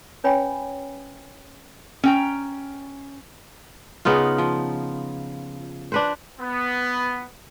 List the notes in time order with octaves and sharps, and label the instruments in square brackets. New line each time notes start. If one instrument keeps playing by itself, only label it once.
[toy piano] C#4 B4 C#5 G5 G#5 B5
[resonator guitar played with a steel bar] C#4 G5 A#5
[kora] C#3 B3 D#4 F4
F3
D4 B4 C5
[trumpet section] B3